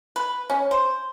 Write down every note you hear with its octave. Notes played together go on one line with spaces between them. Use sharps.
B4
C#4
C5